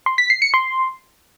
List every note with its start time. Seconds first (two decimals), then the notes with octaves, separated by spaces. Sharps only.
0.06 C6
0.18 B6
0.30 C7
0.42 C#7
0.54 C6